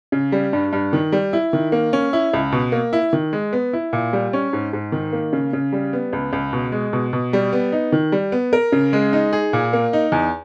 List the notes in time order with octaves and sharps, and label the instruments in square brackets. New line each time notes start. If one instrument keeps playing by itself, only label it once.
[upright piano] C#3
G3
G2
G2
D#3
G3
E4
D#3
A#3
C#4
E4
C#2
B2
A#3
E4
D#3
G#3
B3
E4
A#2
G3
C#4
G#2
G#2
D#3
A#3
C#3
C#3
G3
B3
C#2
C#2
B2
G#3
B2
B2
G3
B3
D#4
D#3
G3
B3
A#4
C#3
G#3
D#4
G#4
A#2
A#3
D#4
E2